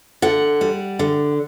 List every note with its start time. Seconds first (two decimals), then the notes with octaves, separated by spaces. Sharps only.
0.22 D3 F#5
0.61 G3
0.99 D3